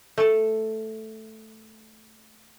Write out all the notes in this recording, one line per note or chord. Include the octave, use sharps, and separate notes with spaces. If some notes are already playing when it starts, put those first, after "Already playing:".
A3 A4